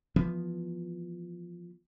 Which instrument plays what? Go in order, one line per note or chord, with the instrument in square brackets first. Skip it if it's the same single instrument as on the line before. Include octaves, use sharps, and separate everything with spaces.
[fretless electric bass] E3 F3 B3